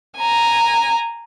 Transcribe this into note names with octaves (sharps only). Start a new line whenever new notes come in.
G#5 A#5